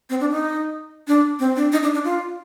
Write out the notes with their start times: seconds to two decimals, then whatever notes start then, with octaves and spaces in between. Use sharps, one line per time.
0.10 C4
0.20 D4
0.31 D#4
1.07 D4
1.39 C4
1.56 D4
1.72 D#4
1.83 D4
1.94 D4
2.04 F4